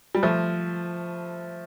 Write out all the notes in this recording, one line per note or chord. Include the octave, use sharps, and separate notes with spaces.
G3
F3 A3